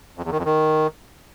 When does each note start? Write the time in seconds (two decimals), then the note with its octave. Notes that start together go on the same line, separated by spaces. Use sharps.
0.18 F2
0.25 E2
0.32 D#3
0.39 F2
0.46 D#3